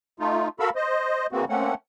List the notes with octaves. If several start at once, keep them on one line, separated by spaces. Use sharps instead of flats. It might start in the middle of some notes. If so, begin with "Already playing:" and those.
A3 D#4 F4
F#4 A4 A#4 F5 B5 E6
C5 D#5
C#3 E3 A#3 C4 F#4
A3 A#3 C4 C#4 F#5